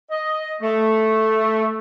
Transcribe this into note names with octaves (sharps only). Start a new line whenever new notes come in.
D#5
A3